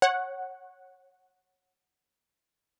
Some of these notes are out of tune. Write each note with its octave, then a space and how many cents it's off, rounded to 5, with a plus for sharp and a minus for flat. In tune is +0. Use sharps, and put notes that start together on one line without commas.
C#5 -20 F#5 +0